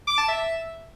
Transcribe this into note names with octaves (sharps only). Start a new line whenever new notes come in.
D6
A5
E5